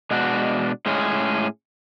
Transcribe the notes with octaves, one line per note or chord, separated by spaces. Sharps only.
B2 G#3 D4 F#4
A2 G#3 C#4 G#4